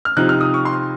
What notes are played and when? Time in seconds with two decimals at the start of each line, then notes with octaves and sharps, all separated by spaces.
0.05 F6
0.17 C3 F3 C4 D#4 F#6
0.29 F6
0.41 D#6
0.54 C#6
0.65 C6